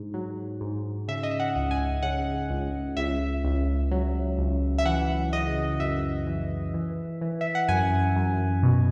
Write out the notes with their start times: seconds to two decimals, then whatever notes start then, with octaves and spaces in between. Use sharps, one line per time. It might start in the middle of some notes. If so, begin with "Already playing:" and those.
Already playing: G#2
0.14 F#3
0.61 G#2
1.08 C#3 E5
1.23 D#5
1.31 E5
1.40 F#5
1.56 C#2
1.71 G#5
2.03 C#3 F#5
2.50 C#2
2.97 C#2 E5
3.44 C#2
3.91 F#3
4.38 C#2
4.78 E5
4.85 E3 F#5
5.33 C#3 D#5
5.79 F#2 E5
6.27 E3
6.74 E3
7.21 E3
7.41 E5
7.55 F#5
7.68 F#2 G#5
8.16 F#2
8.63 B2